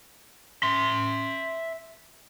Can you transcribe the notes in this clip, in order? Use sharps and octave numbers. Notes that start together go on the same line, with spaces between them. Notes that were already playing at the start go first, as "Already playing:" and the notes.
E5 C6